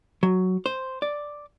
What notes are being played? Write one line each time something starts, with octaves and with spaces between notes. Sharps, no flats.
F#3
C5
D5